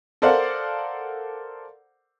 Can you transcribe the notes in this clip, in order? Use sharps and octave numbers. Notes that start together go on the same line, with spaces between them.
A4 A#4 C5 D5 F5 F#5